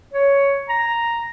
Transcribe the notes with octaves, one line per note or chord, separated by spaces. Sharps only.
C#5
A#5